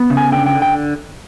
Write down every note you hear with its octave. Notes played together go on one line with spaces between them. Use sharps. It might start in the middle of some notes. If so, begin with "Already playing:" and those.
Already playing: B3
C#3
G#5
D3 G5
G5
D3
G5